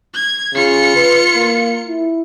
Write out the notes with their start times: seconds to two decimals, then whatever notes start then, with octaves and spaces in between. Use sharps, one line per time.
0.14 G#6
0.55 C#3 F4 C#7
0.96 B4
1.35 A#3
1.89 E4